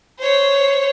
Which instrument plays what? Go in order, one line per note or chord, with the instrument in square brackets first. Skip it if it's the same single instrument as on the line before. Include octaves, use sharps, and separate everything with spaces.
[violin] C5 C#5